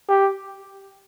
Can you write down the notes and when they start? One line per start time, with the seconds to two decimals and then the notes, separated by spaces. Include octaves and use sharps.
0.09 G4